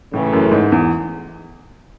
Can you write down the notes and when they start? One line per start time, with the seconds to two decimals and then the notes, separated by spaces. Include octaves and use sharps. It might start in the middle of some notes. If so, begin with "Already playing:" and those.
0.13 A2 C#3 E3 A3
0.33 F#2
0.52 G#2
0.72 E2